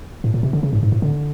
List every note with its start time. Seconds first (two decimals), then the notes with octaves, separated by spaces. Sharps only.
0.24 A2
0.34 A#2
0.43 C3
0.53 D3
0.63 C#3
0.73 G#2
0.83 G#2
0.92 A2
1.02 D3